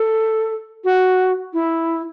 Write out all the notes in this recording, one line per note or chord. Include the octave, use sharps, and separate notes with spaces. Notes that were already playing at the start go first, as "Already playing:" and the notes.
Already playing: A4
F#4
E4